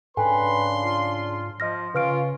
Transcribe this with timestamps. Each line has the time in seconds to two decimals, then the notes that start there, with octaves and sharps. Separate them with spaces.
0.17 G#2 C#3 D4 A4 B4 G5 G#5 C6
0.85 F4
1.60 F3 D#5 F6 A#6
1.95 C#3 C#4 F4 B4 F6 D7